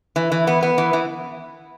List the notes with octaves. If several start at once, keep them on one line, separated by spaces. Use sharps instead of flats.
E3
E3
B3
B3
E3
E3